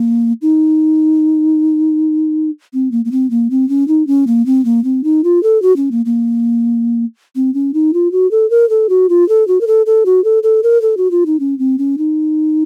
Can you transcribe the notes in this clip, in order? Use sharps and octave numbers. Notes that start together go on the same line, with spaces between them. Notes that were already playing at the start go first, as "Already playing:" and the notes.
Already playing: A#3
D#4
C4
A#3
A#3
C4
A#3
C4
C#4
D#4
C#4
A#3
C4
A#3
C4
D#4
F4
A4
F#4
C#4
A#3
A#3
C4
C#4
D#4
F4
F#4
A4
A#4
A4
F#4
F4
A4
F#4
A#4
A4
A4
F#4
A4
A4
A#4
A4
F#4
F4
D#4
C#4
C4
C#4
D#4